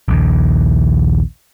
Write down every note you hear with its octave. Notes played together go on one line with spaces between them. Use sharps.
A#1 D#2